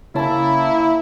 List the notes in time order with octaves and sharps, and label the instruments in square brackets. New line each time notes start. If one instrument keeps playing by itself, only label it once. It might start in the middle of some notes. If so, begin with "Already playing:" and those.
[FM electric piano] C#3 C#4 A5 [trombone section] A#3 E4